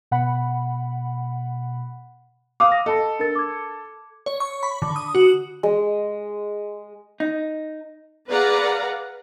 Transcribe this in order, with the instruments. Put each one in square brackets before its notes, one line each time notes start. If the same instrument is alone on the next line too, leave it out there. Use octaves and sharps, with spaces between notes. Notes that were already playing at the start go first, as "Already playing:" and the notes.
[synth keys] B2 F#5 B5
[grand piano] F5 D#6 [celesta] D6
[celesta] A#6
[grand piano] A4 [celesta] D#5 A5 B5
[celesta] D4 A#4 A6
D6 G#6
[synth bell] C#5
C#6
B5
D3
D#6
F#4
[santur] G#3
[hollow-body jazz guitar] D#4
[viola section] G#4 B4 D5 F5 F#5 A#5